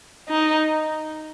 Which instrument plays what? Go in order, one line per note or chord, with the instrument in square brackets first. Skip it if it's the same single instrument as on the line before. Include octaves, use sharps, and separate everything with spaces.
[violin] D#4